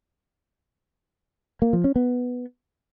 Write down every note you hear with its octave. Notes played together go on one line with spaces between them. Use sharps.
A#3
F3
C#4
B3